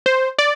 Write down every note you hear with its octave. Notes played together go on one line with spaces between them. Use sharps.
C5
D5